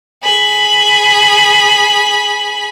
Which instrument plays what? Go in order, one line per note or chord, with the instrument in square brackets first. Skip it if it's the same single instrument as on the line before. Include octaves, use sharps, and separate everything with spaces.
[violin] G#4 B5